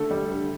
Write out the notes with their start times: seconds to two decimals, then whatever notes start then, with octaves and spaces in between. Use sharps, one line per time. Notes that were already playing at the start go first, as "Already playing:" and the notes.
Already playing: D3 A3 A4
0.11 G3
0.31 D3